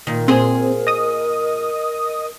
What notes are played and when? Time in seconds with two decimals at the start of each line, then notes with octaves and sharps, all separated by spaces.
0.07 A#2 D#3 A#4
0.28 A#2 C4 G#4 C5
0.87 D#5 D#6